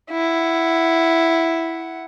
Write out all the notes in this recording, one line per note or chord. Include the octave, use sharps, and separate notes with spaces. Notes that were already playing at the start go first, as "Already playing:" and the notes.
E4 F#5